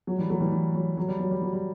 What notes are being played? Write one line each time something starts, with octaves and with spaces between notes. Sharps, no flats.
F#3
E3 G3
F#3 A3
E3 G3
E3
F#3
F#3
G3
F#3
G3
F#3
G3